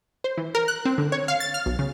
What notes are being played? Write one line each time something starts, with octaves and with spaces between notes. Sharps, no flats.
C5
E3
A#4
F#6
C4
D3
C#5
F5
A6
F6
B1
C#3